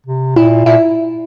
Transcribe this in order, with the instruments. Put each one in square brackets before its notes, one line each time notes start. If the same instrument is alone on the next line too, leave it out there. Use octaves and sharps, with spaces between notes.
[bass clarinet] C3
[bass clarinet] A#2 [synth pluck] E4
[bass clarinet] A#2 [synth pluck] E4